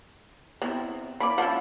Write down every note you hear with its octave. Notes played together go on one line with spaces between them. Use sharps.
C3 B3 E4 E5
A#3 E4 D5 B5
F3 C#4 E4 F4 F#5